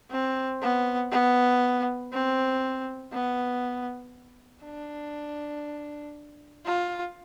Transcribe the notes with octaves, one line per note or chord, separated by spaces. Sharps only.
C4
B3
B3
C4
B3
D4
F4